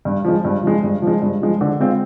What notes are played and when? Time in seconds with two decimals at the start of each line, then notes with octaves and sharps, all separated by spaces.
0.05 G2
0.25 F3 G#3
0.45 G2
0.63 F3 G#3
0.83 G2
1.02 F3
1.07 G#3
1.22 G2
1.41 F3 G#3
1.61 D3
1.80 G#3 C4 F4